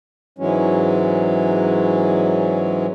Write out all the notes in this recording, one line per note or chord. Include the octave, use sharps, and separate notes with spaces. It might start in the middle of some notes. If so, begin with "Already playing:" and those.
G#2 E3 F#3 G#3 C#4